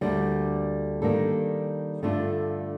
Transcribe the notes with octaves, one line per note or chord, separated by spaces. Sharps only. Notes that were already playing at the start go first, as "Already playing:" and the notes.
D2 D3 G3 A#3 D4
D#3 G3 A#3 D4 A4
G2 D3 A3 D4 F4